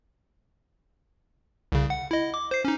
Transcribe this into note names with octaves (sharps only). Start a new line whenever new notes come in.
C2 C#3
F#5
E4 D#5
D6
C5 C7
C#4 D#4